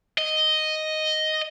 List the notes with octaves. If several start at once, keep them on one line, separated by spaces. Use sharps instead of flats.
D#5